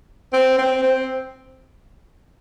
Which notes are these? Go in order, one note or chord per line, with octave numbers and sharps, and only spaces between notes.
C4
C4
C4